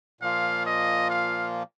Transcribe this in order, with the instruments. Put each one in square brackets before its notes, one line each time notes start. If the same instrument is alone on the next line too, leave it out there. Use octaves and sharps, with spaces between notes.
[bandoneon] A#2 F3 A#3 F4 [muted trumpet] F5
[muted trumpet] D#5
F5